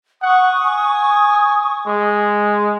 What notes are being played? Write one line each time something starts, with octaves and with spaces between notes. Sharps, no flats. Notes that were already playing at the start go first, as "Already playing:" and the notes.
F#5 C#6 D#6
G#5
G#3